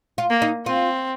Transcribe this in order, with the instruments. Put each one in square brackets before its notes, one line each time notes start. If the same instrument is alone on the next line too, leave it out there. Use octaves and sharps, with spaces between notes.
[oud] F4
[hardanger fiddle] A#3
[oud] D#4
[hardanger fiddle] C4 [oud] F4